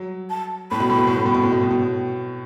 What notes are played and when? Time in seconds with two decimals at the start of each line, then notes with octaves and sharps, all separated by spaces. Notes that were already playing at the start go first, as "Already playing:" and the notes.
Already playing: F#3
0.30 A5
0.71 A2 B5
0.80 B2
0.90 A2
0.99 B2
1.07 A2
1.16 B2
1.26 A2
1.35 B2
1.43 A2
1.52 B2
1.61 A2
1.71 B2
1.80 A2